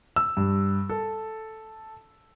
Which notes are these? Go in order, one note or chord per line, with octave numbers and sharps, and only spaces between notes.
E6
G2
A4